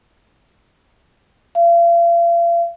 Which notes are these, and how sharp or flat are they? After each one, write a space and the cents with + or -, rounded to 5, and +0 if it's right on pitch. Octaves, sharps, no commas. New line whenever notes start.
F5 -40